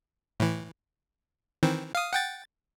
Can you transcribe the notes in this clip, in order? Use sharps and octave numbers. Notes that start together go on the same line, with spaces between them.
A2 E3
D#3 E3 C4
F5 D#6
F#5 G5 A6